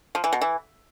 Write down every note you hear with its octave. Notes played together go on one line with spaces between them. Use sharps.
F3
E3
B2
E3